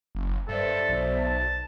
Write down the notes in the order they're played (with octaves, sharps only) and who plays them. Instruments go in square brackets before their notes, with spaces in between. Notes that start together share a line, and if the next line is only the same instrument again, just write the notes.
[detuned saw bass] F#1
[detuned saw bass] G2 [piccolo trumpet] A4 [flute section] C5 D5 E5
[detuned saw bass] B1
[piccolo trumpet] A5